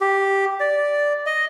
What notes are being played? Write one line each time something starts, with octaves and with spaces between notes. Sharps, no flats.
G4
D5
D#5